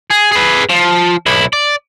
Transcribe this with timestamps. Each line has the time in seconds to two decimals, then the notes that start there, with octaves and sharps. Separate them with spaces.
0.11 G#4
0.32 G#4 B4
0.70 F3
1.26 B1 E4
1.53 D5